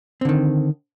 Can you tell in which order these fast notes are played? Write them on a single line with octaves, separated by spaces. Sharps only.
C4 D3 D#3